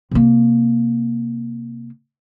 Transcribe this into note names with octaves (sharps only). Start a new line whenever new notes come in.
C3 A#3